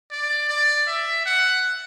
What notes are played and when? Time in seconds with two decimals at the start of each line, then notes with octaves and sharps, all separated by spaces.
0.11 D5
0.49 D5
0.87 E5
1.26 F#5